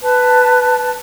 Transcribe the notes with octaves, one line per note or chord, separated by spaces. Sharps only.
B4 A5